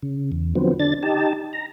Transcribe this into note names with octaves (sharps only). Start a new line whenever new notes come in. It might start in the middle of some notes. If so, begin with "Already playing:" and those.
C#3
E2
D3 F3 F#3 B3 C4
D3 D4 A6
D#4 G4 A5
A#5